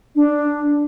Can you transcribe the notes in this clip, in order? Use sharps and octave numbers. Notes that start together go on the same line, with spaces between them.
D4